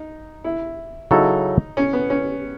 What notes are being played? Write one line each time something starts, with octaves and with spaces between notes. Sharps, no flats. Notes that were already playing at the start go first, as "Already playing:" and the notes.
Already playing: D#4
E4
C#3 F#3 C#4 D#4 E4 A4
C#4
B3
C#4